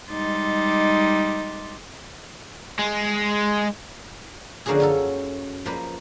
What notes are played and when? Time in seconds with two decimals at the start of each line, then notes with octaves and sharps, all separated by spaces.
0.11 G3 G#3 D#4 C6 D6 A6
2.79 G#3
4.66 D3 F3 A#3 C#4 F#4 G#4
4.80 F#2 C#4 A4
5.66 F3 A#3 B4